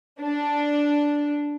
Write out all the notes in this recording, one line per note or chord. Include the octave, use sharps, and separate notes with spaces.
D4